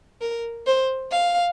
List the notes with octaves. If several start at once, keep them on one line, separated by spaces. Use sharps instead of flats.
A#4
C5
F5